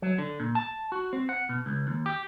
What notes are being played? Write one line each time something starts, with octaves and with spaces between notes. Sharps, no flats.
F#3
D3
A#2
A5
F#4
C4
F#5
B2
C#2
D#2
G4